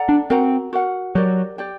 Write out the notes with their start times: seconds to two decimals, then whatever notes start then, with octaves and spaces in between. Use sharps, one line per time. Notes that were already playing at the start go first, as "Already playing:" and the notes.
Already playing: A4 D5 F#5 A#5
0.09 D4
0.30 C4 F#4 A#4 F#5 A#5
0.73 F#4 A#4 F#5
1.15 F#3 G4 A#4 D5
1.58 G4 D5 G5